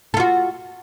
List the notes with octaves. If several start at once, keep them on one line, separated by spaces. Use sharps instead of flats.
F4 F#4 A4